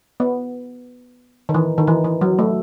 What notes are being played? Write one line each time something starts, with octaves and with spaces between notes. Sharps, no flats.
B3
D#3
E3
D#3
E3
E3
F#3
A3